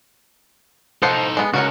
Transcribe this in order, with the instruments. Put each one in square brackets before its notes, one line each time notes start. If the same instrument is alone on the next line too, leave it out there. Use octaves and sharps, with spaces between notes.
[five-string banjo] F3 C5 F#5 [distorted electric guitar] D#4 A4
[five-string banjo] G#3 B3
[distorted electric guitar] C#2 [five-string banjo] F#4 A#4 F#5